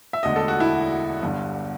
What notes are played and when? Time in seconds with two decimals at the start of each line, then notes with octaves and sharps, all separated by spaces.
0.13 E5
0.23 E1 D2 D3 D#5
0.36 A4
0.48 F#4
0.60 E4
1.22 G1 G2 D3